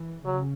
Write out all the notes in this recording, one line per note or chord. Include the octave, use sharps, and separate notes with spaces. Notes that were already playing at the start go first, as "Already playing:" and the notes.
Already playing: E3
C#3 F#3